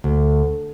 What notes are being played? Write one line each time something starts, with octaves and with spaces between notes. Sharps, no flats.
D2